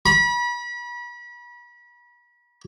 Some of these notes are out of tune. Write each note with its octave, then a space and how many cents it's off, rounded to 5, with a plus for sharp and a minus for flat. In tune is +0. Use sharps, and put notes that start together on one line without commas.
B5 -35